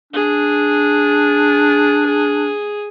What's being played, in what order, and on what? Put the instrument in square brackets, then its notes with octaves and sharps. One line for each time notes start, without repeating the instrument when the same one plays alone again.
[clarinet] D4 [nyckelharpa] G#4